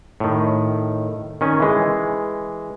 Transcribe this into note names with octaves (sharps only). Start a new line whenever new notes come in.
A2 D#3
D#3 C#4 G#5
E3 G#3